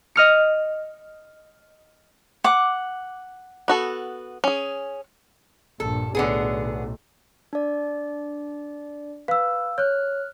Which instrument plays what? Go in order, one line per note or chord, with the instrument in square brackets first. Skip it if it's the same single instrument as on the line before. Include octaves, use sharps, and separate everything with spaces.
[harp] D#5 F6 C#7
[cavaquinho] F#5 D6
[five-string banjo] B3 F#4 A4
C#4 G#4
[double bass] A#1 G2 [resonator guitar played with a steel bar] A4
[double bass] B1 A2 [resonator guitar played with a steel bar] D3 B3 G#4
[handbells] D4 D5
[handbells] B4 [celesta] F5 E6
[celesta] C#5 [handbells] F6 F#6